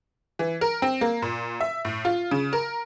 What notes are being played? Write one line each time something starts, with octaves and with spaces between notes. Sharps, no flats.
E3
A#4
C4
A#3
A#2
E5
A2
F4
C#3
A#4